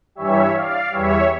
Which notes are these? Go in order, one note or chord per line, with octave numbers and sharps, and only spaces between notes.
G2 E3 G3 C#5 E5
D5 F5
E2 E3 G3 C#5 E5